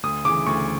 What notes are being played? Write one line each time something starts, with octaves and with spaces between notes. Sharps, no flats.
D2 D#6
C#3 E3 D6
D2 C#6